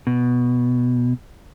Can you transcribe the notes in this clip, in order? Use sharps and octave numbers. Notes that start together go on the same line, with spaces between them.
B2